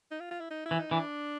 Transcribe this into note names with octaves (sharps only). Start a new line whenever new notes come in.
D#4
F4
F4
E4
D#4
E4
E3
D#4
E3 D4